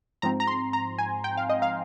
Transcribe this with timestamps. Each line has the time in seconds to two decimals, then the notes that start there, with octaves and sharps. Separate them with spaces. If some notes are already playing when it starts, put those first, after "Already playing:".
0.22 G#2 F3 C4 A#5
0.40 A#5
0.47 C6
0.73 A#5
0.98 G#5
1.24 G5
1.37 F5
1.49 D#5
1.62 F5